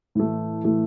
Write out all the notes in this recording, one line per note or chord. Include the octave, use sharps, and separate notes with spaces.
A2 E3 A3
A2 E3 A3